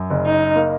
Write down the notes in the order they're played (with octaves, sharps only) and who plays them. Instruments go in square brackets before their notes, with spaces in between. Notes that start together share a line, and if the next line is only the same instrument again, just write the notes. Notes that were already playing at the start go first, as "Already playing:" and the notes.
Already playing: [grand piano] F#2
F#1
[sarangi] D#4
[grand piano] A#3